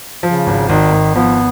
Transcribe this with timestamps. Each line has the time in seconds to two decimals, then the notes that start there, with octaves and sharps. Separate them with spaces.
0.23 C#3 F3
0.47 G#1
0.69 G#1 D#3
0.92 G#1
1.15 F3 B3